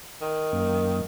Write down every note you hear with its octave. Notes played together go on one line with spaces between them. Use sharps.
D#3
F#2 A#3